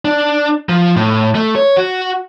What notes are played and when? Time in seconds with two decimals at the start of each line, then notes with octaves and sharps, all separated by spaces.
0.05 D4
0.69 F3
0.96 A2
1.35 A3
1.55 C#5
1.77 F#4